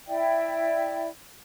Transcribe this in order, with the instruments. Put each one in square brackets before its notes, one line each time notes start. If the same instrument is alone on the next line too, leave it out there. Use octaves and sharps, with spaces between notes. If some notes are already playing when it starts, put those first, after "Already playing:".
[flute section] E4 D5 E5 G5